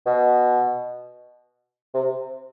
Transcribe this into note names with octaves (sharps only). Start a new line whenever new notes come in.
B2
C3